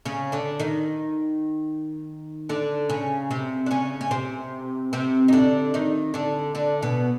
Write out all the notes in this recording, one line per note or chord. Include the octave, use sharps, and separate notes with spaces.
C#3 C#4
D3 D4
D#3 D#4
D3 D4
C#3 C#4
C3 C4
D4
C#3 C#4
C#4
C3 C4
C3 C4
D#4
D3 D4
D#3 D#4
D3 D4
D3 D4
B2 B3